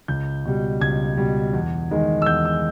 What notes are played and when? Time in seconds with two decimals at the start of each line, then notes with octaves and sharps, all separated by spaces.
0.08 C#2 G6
0.45 B2 G3
0.81 C#2 G#6
1.17 B2 G3
1.54 E2
1.91 D#3 G#3 D#4
2.22 E6
2.26 E2 G6
2.45 E6